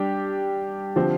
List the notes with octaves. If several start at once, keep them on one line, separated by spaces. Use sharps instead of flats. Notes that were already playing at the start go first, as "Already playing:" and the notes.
Already playing: G3 D4 G4
D3 F3 C4 G4